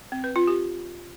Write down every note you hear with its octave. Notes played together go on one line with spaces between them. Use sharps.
C4
B4
F4
G4